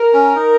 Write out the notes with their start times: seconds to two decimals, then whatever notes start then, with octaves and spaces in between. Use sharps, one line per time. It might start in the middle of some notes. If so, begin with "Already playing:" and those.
Already playing: A#4
0.13 C#4
0.35 D#4